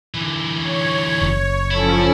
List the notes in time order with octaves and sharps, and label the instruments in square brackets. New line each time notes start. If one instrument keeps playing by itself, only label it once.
[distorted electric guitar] D3 E3
[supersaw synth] C#5
[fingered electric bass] F#1
[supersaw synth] F3 C#4 A4 [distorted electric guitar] E4